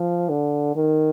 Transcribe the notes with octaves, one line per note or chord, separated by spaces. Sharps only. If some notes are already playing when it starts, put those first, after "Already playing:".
Already playing: F3
D3
D#3